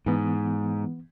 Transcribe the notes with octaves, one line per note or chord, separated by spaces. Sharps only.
G#2 E3 B3